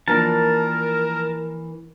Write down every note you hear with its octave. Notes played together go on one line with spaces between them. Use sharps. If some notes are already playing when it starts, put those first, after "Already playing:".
E3 F3 A#3 D4 A#4 A5